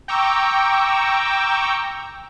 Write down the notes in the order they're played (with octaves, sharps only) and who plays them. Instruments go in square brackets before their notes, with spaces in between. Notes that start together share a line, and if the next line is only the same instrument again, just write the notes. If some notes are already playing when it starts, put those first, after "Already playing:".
[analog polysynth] G5 A#5 C#6 D6 E6